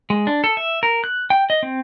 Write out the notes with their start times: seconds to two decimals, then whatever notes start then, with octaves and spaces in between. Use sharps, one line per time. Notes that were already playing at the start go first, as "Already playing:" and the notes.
0.10 G#3
0.27 D4
0.44 A4
0.57 E5
0.83 A#4
1.04 F#6
1.30 G5
1.50 D#5
1.63 C4